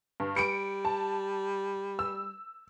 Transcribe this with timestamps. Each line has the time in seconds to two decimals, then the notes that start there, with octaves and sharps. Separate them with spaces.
0.20 G2
0.37 G3 C#7 D7
0.85 A5
1.99 E6